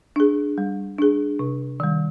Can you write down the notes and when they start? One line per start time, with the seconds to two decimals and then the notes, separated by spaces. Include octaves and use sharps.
0.16 D4 G#4
0.58 G3
0.98 D4 G#4
1.39 C3
1.80 D#3 G3